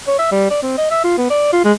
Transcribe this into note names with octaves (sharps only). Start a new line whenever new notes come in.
C#5
E5
G3
D5
C4
D#5
E5
F4
B3
D5
F4
G#3